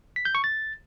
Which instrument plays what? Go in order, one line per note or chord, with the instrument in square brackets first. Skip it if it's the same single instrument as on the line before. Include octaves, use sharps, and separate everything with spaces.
[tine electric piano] B6
G6
C#6
A6